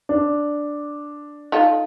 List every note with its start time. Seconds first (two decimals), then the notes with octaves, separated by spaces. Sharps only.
0.09 D4
1.52 D#4 F4 A4